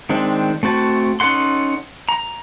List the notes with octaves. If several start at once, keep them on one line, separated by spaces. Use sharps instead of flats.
D#3 G#3 C4 D4
A3 C4 F#4 A5
C#4 D#4 A4 F#5 C6
A#5